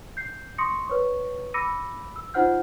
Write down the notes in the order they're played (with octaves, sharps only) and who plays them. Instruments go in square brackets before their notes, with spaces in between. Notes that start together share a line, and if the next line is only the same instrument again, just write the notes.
[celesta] G6 C7
C6 C#6 D#6 A#6 C#7
B4 C#5 C#6
B5 D6 E6 A#6 C#7 D#7
E6
D#4 F4 C5 F#5 F6 G6